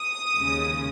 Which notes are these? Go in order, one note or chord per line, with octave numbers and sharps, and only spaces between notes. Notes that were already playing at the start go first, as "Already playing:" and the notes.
Already playing: D#6
D#2 C#3 G#3